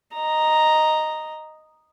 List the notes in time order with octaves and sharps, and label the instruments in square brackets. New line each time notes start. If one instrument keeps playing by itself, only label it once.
[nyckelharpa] D#5 A#5